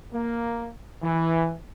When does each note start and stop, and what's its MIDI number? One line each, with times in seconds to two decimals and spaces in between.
0.13 0.68 58
1.03 1.52 52